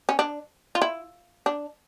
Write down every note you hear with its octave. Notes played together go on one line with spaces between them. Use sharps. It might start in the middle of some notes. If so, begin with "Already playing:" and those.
C#4
D4
F4
E4
D4